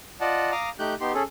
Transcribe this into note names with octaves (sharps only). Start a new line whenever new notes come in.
F4 D5 D#5 F#5 A5
F5 A#5 D6 D#6 F6
A3 D#4 G4 F#6 G6
B3 D#4 G4 C6
C#4 G#4 A4